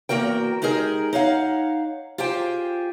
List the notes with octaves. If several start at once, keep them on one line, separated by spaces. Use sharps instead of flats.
E2 A#3 F#4 A#4 G5
G#3 D#4 G4 G#4 A#4
D#4 C#5 F5 F#5
F4 G4 G#4 C5 G5